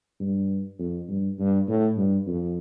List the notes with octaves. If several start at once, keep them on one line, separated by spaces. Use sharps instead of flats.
G2
F2
G2
G2
A2
G2
F2